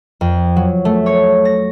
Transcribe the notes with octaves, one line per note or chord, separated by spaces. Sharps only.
F2
F#3
A3
C#5
A#6